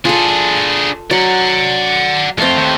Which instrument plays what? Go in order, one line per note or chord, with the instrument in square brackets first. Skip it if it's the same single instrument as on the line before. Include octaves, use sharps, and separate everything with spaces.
[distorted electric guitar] D4 G#4 [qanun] F4 A4
[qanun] F#3 [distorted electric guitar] D5 F#5
[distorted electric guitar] F2 F4 [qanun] A3 C4
[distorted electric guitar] D#2 D#3